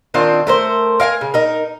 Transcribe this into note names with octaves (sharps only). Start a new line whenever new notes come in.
D#3 C4 D4 F4
A3 A#4 C5
A#4 F5 G5 G#5
C#3
D#4 A#4